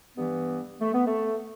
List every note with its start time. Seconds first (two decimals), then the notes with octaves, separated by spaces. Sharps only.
0.16 G2 E3 B3
0.81 A3
0.93 B3
1.06 A3